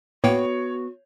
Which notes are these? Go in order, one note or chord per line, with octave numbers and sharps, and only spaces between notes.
A2 A#3 B3 F#4 C#5 G5